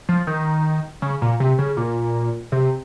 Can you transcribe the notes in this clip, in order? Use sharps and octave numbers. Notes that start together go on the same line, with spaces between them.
F3
D#3
C#3
A#2
C3
C#3
A#2
C3